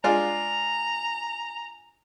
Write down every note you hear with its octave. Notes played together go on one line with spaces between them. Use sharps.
G#3 D4 F4 G#5 A#5